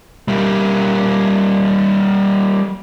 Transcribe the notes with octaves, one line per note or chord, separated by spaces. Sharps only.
G3 A#3